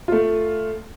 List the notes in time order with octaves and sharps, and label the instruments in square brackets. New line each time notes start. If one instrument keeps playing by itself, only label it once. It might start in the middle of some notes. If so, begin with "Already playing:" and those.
[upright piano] A3 F4